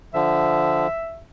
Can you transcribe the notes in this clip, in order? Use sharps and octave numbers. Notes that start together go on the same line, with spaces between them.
D3 F3 E5